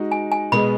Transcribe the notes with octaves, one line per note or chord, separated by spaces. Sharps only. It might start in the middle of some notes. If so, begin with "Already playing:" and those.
Already playing: G#3 D#4 F#4
G#5
G#5
B2 G#3 B3 G#4 B5